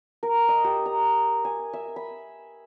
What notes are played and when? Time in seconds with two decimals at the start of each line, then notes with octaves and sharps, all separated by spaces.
0.23 A#4
0.48 D#5
0.64 G4
0.86 A#5
1.45 G#5
1.73 E5
1.96 B5